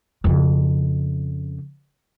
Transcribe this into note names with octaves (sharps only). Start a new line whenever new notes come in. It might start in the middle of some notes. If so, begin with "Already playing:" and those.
F2 C#3